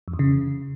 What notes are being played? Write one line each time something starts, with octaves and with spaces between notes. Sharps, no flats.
F2
E2
C#3